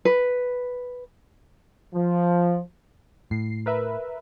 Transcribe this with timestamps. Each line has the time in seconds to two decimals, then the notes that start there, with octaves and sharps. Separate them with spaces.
0.05 B4
1.95 F3
3.31 A2 C7
3.66 A#4 B4 E5